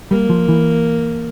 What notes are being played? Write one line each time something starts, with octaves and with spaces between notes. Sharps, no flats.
G3 A#3
F3
E3